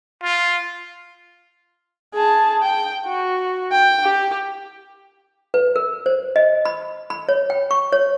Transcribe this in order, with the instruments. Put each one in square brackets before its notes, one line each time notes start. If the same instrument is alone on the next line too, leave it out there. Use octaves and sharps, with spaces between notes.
[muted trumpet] F4
[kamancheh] G#4 A5
G5
F#4
G5
G4
[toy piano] B4
A#4
C5
D#5
B5
B5
C#5
G5
C#6
C#5